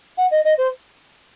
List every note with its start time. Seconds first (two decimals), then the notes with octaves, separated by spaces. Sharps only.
0.17 F#5
0.31 D#5
0.44 D#5
0.57 C5